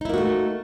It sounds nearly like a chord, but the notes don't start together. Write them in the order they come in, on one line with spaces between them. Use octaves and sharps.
D#4 E4 A#3 F#4 A3